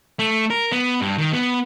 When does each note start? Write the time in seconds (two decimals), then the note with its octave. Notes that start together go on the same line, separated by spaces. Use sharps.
0.19 A3
0.50 A#4
0.72 B3
1.01 G2
1.18 D#3
1.33 B3